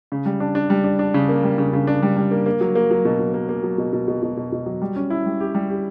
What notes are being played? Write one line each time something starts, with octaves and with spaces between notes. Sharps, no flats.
C#3
G3
D4
D4
G3
D4
D4
C#3
A#3
G3
C#3
C#3
D4
G3
G3
A#3
A#3
F#3
A#3
F#3
B2
F#3
A#3
A#3
F#3
B2
B2
B2
B2
B2
B2
F#3
G3
C#4
E4
G3
G4
G3
G4